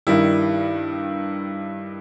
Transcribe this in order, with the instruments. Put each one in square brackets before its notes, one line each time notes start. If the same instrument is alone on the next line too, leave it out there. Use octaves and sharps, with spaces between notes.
[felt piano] G2 D#3 G3 [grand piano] E4